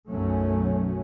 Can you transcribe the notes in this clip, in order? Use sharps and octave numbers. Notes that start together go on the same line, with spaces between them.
B1 F#2 F#3 A3 C#4